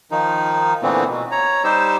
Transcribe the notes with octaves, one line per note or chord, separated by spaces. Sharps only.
D#3 F3 D#4
A#2 D3 E3 A3 B3 C4
B2
C#5 A#5
G3 D#4 G4 C5 E6